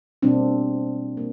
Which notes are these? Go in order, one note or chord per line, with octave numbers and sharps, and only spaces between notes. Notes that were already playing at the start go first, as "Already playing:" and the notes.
B2 G3 A#3 C4 D4
A#3